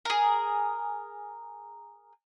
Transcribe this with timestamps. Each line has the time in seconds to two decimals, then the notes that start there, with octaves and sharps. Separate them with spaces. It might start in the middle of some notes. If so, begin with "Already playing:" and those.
0.05 G#4 A#4